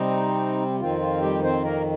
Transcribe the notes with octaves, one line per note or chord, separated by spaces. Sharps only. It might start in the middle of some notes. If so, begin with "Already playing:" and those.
Already playing: C3 G3 C4 D#4
F2 D#3 C4 F4
F4
G3 G4
C4 C5
A#3 A#4